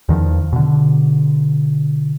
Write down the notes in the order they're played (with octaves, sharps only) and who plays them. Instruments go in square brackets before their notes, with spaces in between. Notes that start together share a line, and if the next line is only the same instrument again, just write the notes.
[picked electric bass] E2 D#3 F3
B2 D3